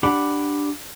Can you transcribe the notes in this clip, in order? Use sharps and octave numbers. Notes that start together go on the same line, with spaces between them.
D4 G4 F#5 B5